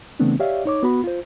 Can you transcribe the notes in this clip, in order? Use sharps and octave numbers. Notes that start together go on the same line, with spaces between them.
C#3 E3 A3 B3 C4 D4
G4 C#5 D5 E5 F5
D#4 C#5 D6
B3 F#4 B5
F4 C5